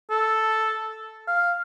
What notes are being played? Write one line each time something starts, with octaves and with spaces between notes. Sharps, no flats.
A4
F5